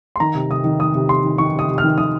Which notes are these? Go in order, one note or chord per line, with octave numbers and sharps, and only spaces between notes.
C6
D#3 A#5
C3
C3 D#6
D#3
D#3 D#6
C3
C3 C6
D#3
D#3 C#6
C3
D#6
C3
F6
D#3
D#3 D#6